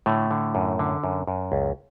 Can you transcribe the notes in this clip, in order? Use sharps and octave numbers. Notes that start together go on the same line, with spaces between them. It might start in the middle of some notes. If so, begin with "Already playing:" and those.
A2 D3 A3
D3
F#2
D3
F#2
F#2
C#2